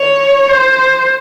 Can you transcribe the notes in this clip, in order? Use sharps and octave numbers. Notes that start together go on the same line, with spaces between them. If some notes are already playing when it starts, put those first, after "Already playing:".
Already playing: C#5
C5